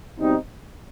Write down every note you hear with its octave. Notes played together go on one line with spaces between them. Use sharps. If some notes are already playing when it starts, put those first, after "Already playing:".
B2 G3 C4 D#4